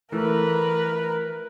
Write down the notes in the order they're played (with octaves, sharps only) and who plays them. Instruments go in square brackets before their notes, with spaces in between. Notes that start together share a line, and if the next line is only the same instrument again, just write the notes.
[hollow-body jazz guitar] E3 A3 [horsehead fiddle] A#4 B4